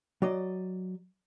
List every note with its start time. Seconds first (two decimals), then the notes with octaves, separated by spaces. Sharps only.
0.22 F#3 D5 D#5